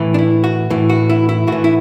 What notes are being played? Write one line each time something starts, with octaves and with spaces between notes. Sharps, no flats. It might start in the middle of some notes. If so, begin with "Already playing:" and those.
Already playing: A2 E3
D4
E4
F#4
A2 E3
F#4
E4
E4
A2 E3 F#4
E4